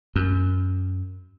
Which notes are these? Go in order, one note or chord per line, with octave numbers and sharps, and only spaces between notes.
F#2